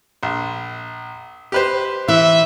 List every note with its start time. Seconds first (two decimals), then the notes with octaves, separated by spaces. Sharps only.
0.23 A#1
1.52 G4 B4 C5
2.08 E3 E5